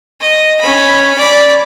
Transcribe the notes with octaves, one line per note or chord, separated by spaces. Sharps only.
D#5
C#4 B5
D5 B5